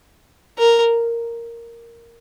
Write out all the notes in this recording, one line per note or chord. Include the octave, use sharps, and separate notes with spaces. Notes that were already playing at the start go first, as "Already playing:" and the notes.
A#4